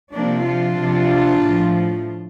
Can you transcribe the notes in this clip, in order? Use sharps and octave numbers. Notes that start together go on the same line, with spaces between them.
C3 F3 A#3 D4
D4 F4
C3 F3
A2 F3